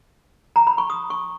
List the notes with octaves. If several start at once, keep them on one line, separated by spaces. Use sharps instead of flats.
A#5
B5
C#6
D#6
C#6